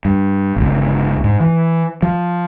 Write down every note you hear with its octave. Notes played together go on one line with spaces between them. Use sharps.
G2
G1 C#2
G#2
E3
F3